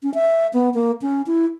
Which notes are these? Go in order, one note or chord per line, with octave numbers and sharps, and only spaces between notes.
C#4
E5
B3
A#3
C#4
E4